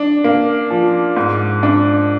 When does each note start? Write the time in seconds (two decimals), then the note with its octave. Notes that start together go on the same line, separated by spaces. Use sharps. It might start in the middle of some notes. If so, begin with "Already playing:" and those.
Already playing: D4
0.24 A#3
0.71 F3
1.16 G#2
1.63 D4